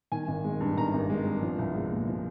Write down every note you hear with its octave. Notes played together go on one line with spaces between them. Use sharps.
D#3 G#5
G#1
G#3
G2
D#3 A#5
G#1
G#3
G2
F3
C2
G#3
A#2
F3